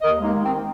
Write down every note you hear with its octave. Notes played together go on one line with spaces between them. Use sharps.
D#2 A#4 D#5
G#3
A#3 D#4
D#3
C4